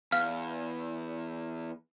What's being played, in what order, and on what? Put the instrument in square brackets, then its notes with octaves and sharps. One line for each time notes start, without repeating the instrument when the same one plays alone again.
[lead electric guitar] E2 [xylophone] F5 F6